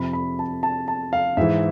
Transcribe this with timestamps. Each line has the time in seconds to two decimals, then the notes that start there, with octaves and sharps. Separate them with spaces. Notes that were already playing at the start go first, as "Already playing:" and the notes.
Already playing: F2 C3 F3 B5
0.13 B5
0.39 A5
0.63 A5
0.88 A5
1.13 F5
1.37 G#2 E3 E5